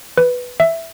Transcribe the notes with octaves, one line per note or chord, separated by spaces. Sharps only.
B4
E5